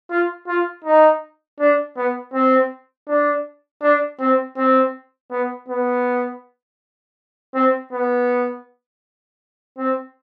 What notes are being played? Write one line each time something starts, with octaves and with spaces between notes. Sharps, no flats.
F4
F4
D#4
D4
B3
C4
D4
D4
C4
C4
B3
B3
C4
B3
C4